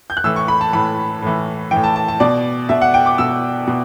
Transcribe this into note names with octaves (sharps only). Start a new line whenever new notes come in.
G6
F#6
A2 E3 E6
C#6
B5
A5
A2 E3 B5
A2 E3
A2 E3 G5
A5
A5
A5
B2 D5
B2 E5
F#5
G5
D6
B2 E6
B2